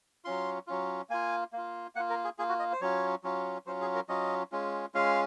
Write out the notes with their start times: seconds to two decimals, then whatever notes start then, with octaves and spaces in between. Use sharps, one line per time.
0.25 F#3 C#4 F4 C6
0.67 F#3 C#4 F4
1.10 A#3 F4 G#5
1.53 A#3 F4
1.95 A#3 F#5
2.00 F4
2.10 A#4
2.24 G#4
2.38 A#3 F4 G#4
2.49 F#4
2.59 D#5
2.73 C5
2.81 F#3 C#4 F4 C#5
3.24 F#3 C#4 F4
3.66 F#3 C#4 F4 C5
3.81 G#4
3.95 A#4
4.09 F#3 C#4 F4 D#5
4.52 G#3 C#4 F4
4.94 G#3 C#4 F4 F5